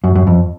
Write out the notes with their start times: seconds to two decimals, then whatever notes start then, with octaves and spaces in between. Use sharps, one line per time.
0.04 F#2
0.15 F#2
0.27 F2